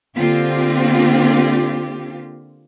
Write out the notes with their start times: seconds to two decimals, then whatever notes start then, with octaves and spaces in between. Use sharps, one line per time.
0.16 D3 A#3 C4 F4 G4